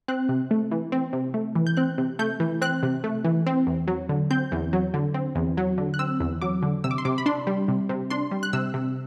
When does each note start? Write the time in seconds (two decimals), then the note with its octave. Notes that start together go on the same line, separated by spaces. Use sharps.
0.08 C4 F#6
0.29 C3
0.51 A3
0.72 E3
0.92 C4
1.13 C3
1.34 A3
1.56 E3
1.67 G6
1.77 C4 F#6
1.98 C3
2.19 A3 G6
2.40 E3
2.62 C4 F#6
2.83 C3
3.04 A3
3.25 E3
3.47 C4
3.67 E2
3.88 F#3
4.09 D3
4.31 C4 G6
4.52 E2
4.73 F#3
4.94 D3
5.14 C4
5.35 E2
5.57 F#3
5.78 D3
5.94 F#6
5.99 C4 E6
6.20 E2
6.42 F#3 D6
6.63 D3
6.84 C3 E6
6.91 D6
6.98 C6
7.05 C3 D6
7.18 B5
7.26 D4 C6
7.47 G3
7.68 C3
7.89 C3
8.10 D4 C6
8.31 G3
8.43 F#6
8.53 C3 E6
8.74 C3